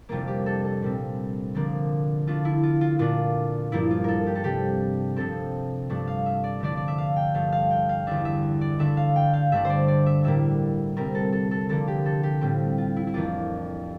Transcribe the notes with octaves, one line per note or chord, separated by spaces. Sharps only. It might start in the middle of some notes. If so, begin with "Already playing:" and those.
F2 C3 G3 A#3 D4 F4
G4
A4
A4
A#2 G3 C4
D3 F3 A#3 D4
D3 A3 D4 F4
E4
F4
F4
A#2 A3 D4 F4
G2 F3 A#3 D4 E4
F4
A4 A#4
G4
A4
C3 G3 D4 G4
C3 F3 C4 A4
G2 F3 A3 D4
F5
E5
D5
D3 F3 A3 D4 D5
D5
E5
F5
G5
G2 F3 A3 F5
F5
G5
F5
E2 D3 G3 D4 E5
E5
D5
D3 A3 D4 E5
F5
G5
F5
G2 D3 A3 D4 E5
C5
D5
D5
E5
A2 E3 G3 A#3 E5
C3 G3 C4 A#4
A4
A4
A4
D3 F3 A#3 D4 A4
G4
A4
G4
A2 G3 C4 F4
F4
E4
E4
F2 E3 A#3 D4 F4